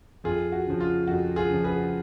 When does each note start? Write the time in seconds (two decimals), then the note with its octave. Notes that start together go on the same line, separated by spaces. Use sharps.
0.24 F2 F4 G#4
0.52 F#4
0.67 C#3 F3
0.80 F4
1.07 F2 F#4
1.36 F4 G#4
1.49 C#3 F3
1.64 G#4 B4